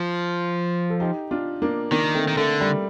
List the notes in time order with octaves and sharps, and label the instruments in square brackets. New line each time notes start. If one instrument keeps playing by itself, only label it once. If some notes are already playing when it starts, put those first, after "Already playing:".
Already playing: [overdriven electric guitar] F3
[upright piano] A4
D#4 G4
D4 F4
A#3 D4
[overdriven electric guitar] D#3 [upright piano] A#3 D4
[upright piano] A3 C4
[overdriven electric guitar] D#3
[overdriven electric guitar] D3 [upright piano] A3
[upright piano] G3